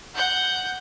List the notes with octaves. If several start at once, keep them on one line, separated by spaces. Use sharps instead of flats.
F#5 G6